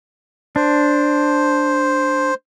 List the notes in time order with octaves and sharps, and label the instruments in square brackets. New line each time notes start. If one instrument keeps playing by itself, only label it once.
[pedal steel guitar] D4 [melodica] C5